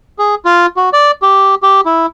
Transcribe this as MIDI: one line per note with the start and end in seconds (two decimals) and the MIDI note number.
0.19 0.35 68
0.45 0.66 65
0.77 0.89 66
0.93 1.11 74
1.22 1.55 67
1.63 1.81 67
1.86 2.06 64